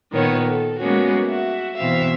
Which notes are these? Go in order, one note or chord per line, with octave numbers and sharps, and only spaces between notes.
A#2 D#3 B3 C#5
A4
G3 G#3 A#3 B3 C#4 F#4
F#4 E5
B2 E3 C4 E5 F5